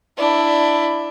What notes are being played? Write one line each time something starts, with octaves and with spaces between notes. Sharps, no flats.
D4 E4